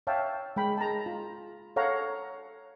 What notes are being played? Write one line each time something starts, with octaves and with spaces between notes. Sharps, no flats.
C#5 E5 F5 G5 A5
G#3 G5 B5
A5 A#5
F4
A4 C#5 F5 F#5 A#5